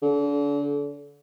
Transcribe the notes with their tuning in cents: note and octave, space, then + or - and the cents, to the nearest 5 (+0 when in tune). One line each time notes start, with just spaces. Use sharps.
D3 -35